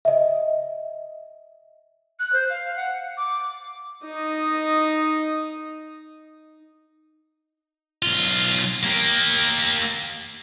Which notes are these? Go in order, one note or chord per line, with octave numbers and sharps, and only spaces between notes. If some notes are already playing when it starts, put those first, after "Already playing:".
D#5 E5
F#6
C5
F5
F#5
D6
D#4 D#5
B1 F4
A#3 G4